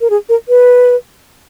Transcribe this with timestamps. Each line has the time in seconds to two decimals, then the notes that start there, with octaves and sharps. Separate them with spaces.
0.01 A#4
0.10 G#4
0.29 A#4
0.49 B4